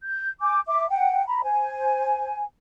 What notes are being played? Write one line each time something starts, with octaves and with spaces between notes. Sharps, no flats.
G6
G#5 D6 G6
E5 D6
F#5 G5
A#5 B5
C5 G#5